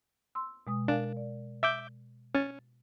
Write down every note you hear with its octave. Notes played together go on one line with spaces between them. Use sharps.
C6 E6
B2 G#3 D#6
D4 A#4 F5 G#5
D5
E5 D6 G6
C#4 A6